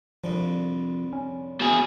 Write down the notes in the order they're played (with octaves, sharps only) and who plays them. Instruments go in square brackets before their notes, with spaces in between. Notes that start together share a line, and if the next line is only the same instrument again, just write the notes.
[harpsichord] C2 F2 D3 [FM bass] F3
[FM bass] C#4
[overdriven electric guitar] B2 G#4